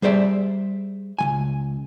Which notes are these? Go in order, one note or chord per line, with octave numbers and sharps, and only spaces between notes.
G3 G#4 C5 D5 E5
C#2 F3 G#5